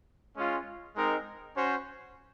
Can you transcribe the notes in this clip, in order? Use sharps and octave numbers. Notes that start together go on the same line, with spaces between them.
G#3 C#4 F4
G#3 C4 D#4 A#4
C#4 F#4 C5